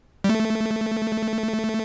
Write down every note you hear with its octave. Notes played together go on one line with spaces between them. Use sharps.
G3
A3